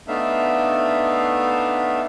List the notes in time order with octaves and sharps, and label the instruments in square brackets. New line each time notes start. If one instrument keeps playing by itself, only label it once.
[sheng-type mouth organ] A3 B3 D4 D#4 E5 F5